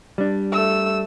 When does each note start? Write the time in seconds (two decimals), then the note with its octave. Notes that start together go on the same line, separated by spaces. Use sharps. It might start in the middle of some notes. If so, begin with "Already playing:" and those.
0.18 G3 D4
0.52 A3 E6